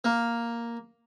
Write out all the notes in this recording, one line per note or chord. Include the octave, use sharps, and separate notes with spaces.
A#3